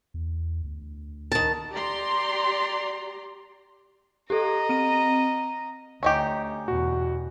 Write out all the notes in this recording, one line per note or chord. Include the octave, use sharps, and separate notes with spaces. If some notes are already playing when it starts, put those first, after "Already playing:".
E2
D2
D#3 A5
G4 D5 A#5 C6
G4 A4 D#5 A#5
C4 D#7
D2 C#4 D#4 G4
E2 B2 F#4